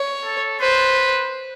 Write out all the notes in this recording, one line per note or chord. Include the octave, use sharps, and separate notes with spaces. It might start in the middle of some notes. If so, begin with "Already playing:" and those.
Already playing: C#5
A4
B4 C5